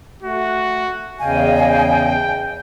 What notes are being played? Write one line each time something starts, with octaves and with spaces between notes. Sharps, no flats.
A3 F#4
E2 C#3 D#5 F5 G5 G#5